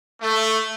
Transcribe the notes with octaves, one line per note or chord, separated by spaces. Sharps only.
A3